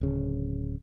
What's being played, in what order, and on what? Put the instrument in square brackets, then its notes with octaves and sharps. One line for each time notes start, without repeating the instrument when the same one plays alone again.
[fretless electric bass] D1 C#3